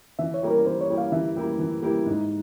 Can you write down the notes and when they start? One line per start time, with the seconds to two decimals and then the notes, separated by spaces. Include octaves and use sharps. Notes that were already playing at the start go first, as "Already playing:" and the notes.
0.19 E3 E5
0.34 C#5
0.43 G3 A#3 E4 G4
0.51 A#4
0.66 E3 C5
0.81 C#5
0.90 G3 A#3 E4 G4
0.98 F5
1.12 E3 E5
1.36 G3 A#3 E4 G4
1.59 E3
1.82 G3 A#3 E4 G4
2.06 G#2